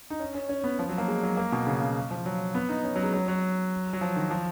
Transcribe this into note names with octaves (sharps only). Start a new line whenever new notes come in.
D#4
C#4
C#4
C#4
B3
F3
F#3
A#3
G#3
F#3
A#3
B2
C#3
B2
F3
F#3
B3
D#4
C#4
F#3
G#3
F#3
F#3
F#3
F3
D#3
F3